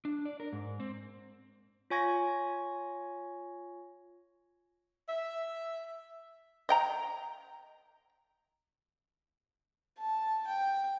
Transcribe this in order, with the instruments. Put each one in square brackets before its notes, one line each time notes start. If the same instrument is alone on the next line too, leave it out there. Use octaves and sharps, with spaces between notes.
[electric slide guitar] D4
D5
A#4
G#2
C4
[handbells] F4 C#5 G#5 C#6 G#6 A#6
[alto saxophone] E5
[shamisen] D#5 G5 A#5
[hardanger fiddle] A5
G5